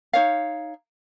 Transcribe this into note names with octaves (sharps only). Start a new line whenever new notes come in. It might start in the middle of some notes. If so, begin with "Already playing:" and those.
D#4 C#5 F5